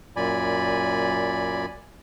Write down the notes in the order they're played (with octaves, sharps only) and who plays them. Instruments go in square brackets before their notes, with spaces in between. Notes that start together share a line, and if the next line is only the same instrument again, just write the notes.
[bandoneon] F#2 A#2 D5 G#5 B5